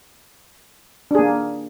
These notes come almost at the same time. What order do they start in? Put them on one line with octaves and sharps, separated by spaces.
D4 G#4 A#3